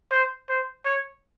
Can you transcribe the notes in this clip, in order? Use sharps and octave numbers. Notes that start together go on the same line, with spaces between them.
C5
C5
C#5